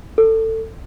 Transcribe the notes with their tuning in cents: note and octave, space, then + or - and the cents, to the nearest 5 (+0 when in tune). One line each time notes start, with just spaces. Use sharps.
A4 +20